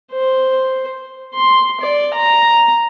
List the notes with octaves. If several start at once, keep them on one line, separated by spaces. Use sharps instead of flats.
C5
C6
D5
A#5